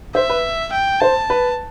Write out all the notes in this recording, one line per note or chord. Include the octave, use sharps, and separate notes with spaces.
C5 E5
B4
G5
C5 A5
B4